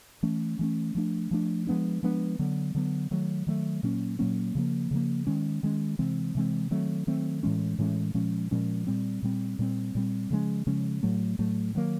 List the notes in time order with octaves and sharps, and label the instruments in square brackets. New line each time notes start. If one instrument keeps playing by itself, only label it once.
[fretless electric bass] E3 A3 C#4
E3 A3 C#4
F3 A3 D4
F3 A3 D4
F3 G#3 B3 D4
F3 G#3 B3 D4
D3 F#3 B3
D3 F#3 B3
D#3 F#3 A3
D#3 F#3 A3
A#2 F#3 A#3 C#4
A#2 F#3 A#3 C#4
C#3 F3 A#3
C#3 F3 A#3
D#3 G#3 C#4
D#3 G#3 C#4
C3 E3 G#3 C4
C3 E3 G#3 C4
D#3 F#3 A3 C4
D#3 F#3 A3 C4
A2 E3 G#3 C#4
A2 E3 G#3 C#4
A#2 F3 G#3 C#4
A#2 F3 G#3 C#4
A#2 G3 C4
A#2 G3 C4
A#2 G3 C4
A#2 G3 C4
C#3 F3 G#3 C#4
C#3 F3 G#3 C#4
A2 F#3 A3
A2 F#3 A3
D#3 F#3 A#3